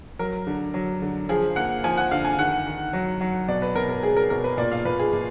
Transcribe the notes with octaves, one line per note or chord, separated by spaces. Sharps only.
F#3 A#4
D3
F#3
D3
F3 G#4
A#3 F#5
F3 G#5
F#5
D3 F5
G#5
D#3 F#5
D#3
F#3
F#3
B2 D5
B4
B2 A#4
A#4
G#3 G#4
A#4
B2 A#4
B4
A#2 D5
F5
A#2 B4
G#4
A#2